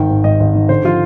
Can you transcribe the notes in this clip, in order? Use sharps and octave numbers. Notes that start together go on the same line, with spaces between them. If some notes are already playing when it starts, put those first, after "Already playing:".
Already playing: G#1 D#3 G5
G#2
G#1 D#5
G#1
D#3
D3 C5
F3 F4